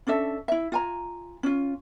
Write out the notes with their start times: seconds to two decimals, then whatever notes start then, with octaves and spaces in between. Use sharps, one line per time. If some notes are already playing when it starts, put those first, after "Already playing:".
0.07 C#4 D4 A4 E5
0.48 E4 E5
0.72 F4 G#5 A#5
1.43 C#4 F4